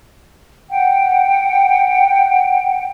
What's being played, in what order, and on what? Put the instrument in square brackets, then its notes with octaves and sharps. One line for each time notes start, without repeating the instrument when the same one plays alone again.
[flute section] F#5 G5